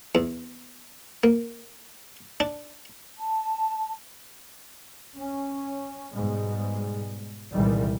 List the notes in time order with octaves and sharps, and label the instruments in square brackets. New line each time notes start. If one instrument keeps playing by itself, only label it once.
[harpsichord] E2
A#3
D4
[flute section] A5
[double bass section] C#4
G#2 B2 G3 G#3
C2 A#2 D#3 E3 G3 G#3